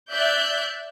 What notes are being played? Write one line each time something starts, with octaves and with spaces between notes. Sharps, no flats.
D5 E5 F#6 G6